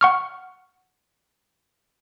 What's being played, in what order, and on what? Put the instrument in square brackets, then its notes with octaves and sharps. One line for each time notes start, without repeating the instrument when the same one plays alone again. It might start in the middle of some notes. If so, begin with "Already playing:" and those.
[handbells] F#5 C#6 F6